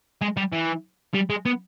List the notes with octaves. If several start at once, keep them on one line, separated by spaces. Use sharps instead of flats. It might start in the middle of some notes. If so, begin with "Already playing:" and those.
G#3
G3
E3
G3
G#3
B3